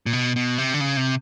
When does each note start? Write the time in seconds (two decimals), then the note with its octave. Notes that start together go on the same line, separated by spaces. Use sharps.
0.06 A#2
0.13 B2
0.36 B2
0.58 C3
0.74 D3
0.81 C#3
0.97 C3